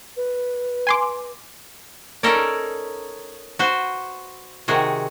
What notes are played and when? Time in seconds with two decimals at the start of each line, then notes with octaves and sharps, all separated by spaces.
0.17 B4
0.87 G#5 C6 D6
2.23 C#4 D#4 A4 A#4 C#5 D5
3.59 F#4 B4 C5
4.68 C3 D#3 F#4 G#4